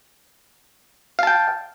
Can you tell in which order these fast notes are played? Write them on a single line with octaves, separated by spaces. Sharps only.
F5 A5 G5